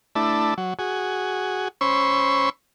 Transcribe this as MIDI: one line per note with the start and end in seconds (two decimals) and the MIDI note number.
0.15 0.54 57
0.15 0.54 62
0.15 0.54 64
0.58 0.74 54
0.79 1.68 66
0.79 1.68 68
1.81 2.50 61
1.81 2.50 72
1.81 2.50 83
1.81 2.50 85
1.81 2.50 88